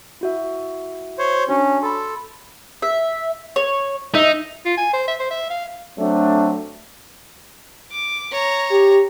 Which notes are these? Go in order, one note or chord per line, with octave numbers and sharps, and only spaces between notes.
E4 F#4 E5
C5 C#5
C#4 D4 F#4
A4 B5 C6
E5
C#5
D#4 E5
F4
G#5
C5
E5
C5
E5
F5
F#3 A3 C4 D4
D6
C#5 A#5
G4